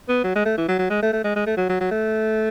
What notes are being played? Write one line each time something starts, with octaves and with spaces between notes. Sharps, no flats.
B3
F#3
G#3
A3
E3
F#3
F#3
G#3
A3
A3
G#3
G#3
A3
F#3
F#3
F#3
A3